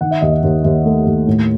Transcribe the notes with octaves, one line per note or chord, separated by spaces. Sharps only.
D#3 F#5
E5
D#2 D#5
E5
D#2
D#2 E5
A3
D#2
A2